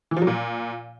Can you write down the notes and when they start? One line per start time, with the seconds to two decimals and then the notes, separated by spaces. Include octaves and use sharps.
0.11 E3
0.16 F3
0.22 F#3
0.27 A#2